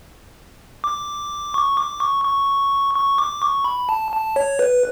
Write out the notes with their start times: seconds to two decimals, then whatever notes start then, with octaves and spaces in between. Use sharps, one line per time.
0.84 D6
1.54 C#6
1.77 D6
2.00 C#6
2.25 C#6
2.95 C#6
3.18 D6
3.42 C#6
3.64 B5
3.89 A5
4.12 A5
4.36 C#5
4.59 B4